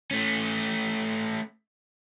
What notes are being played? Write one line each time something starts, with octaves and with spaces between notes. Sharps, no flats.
A3 C#4